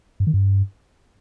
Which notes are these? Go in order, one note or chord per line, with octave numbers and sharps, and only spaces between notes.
G2
D#3
G2